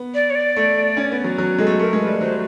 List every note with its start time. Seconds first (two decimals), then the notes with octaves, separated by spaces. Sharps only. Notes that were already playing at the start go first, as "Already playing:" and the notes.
Already playing: B3
0.15 D5
0.30 C#5
0.35 D5
0.56 A3
0.97 C#4
1.12 B3
1.24 F#3
1.38 F#3
1.58 G#3 A4
1.67 A3
1.79 A3 A#4
1.93 G#3
2.01 B4
2.07 G3
2.20 F#3 C5